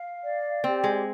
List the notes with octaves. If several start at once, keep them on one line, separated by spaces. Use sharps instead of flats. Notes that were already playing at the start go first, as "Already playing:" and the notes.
Already playing: F5
D5
C4 G4
G#3